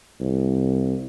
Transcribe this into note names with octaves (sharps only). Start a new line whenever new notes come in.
C2